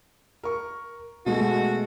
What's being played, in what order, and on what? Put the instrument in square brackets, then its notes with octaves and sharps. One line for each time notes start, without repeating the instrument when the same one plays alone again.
[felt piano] A#4 C#6
[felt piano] B2 G#3 A3 [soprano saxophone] F#4